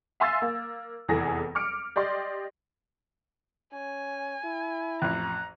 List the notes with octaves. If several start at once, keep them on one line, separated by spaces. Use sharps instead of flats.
E5 F5 G#5 C6 E6 A6
A#3
F1 E2 E3 G#4 A4 A#6
D6 F6 C#7 D7
G4 D5 D#5 C6
C#4 G#5
E4
A1 F2 A#5 F#6